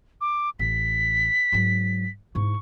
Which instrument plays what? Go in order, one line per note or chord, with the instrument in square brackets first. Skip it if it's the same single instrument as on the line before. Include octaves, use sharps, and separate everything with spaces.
[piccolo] D6
[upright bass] A1 [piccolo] B6
[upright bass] G#2 F#3
[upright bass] G#2 E4 [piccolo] C#6